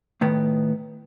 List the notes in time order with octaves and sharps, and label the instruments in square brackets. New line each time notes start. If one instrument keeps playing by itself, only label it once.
[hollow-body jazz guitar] A2 D#3 B3